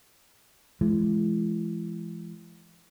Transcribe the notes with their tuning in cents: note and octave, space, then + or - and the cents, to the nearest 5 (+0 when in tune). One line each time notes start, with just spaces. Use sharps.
E3 +40 G#3 +30